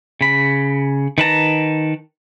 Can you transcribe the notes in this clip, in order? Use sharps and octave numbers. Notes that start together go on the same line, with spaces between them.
C#3 B5
D#3 B4 A5 A#5